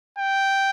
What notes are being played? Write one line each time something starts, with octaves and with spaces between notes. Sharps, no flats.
G5